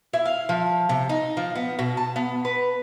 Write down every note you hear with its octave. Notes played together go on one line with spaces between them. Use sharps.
E4
F5
F3
C3
D#4
F3
B3
B2
A5
B3
B4